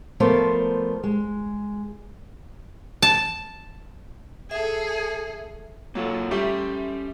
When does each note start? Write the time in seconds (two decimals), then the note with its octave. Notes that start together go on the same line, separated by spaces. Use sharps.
0.20 F3 A3 B3 A#4 C5 D5
1.04 G#3
3.02 A5
4.51 G#4 A4 E5
5.95 F#3 A#3 F4 A4
6.31 G3 A3 C#4 G4 E5